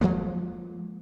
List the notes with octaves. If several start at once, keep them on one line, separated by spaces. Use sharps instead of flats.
F3 F#3 G#3 A#3